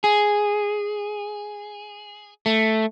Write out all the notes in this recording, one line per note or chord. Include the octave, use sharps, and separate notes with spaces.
G#4
A3